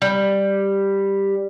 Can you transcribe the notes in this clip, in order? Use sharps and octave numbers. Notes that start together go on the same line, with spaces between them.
G3